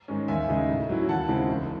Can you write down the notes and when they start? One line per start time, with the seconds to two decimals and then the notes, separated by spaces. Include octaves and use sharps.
0.08 G#2 D#3 G#3 C#4
0.28 D#2 E5 G#5
0.48 C#3 G#3 D#4
0.69 A2
0.89 F#3 C#4 E4
1.09 D#2 F#5 A5
1.28 C#3 G#3 C4 E4
1.48 E1